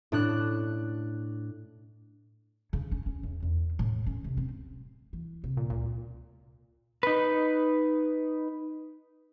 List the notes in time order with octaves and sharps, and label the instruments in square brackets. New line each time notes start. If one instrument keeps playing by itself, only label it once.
[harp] A2 D4 F#6
[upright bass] C#3
C#4
C#4
E2
E2
A2
C#4
C3
C4
E3
C3
[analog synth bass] A#2
[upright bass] C#2 [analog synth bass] A#2
[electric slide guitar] D#4 B4